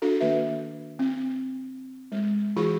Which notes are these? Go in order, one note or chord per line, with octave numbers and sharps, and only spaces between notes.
D4 F#4 A4
D#3 A#3 B4 E5
C4
G#3
E3 F4 F#4 G#4 B5 C#6